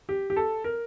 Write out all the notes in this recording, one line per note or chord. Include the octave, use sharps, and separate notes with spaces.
G4
G4
A4
A#4